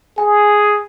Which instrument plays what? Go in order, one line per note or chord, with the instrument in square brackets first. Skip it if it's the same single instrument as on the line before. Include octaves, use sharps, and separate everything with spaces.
[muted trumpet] G#4 [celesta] G#5